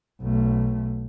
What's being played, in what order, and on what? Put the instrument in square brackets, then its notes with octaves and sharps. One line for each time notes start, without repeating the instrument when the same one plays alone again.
[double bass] B1 A3